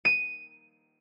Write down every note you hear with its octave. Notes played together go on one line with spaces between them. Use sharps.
D#7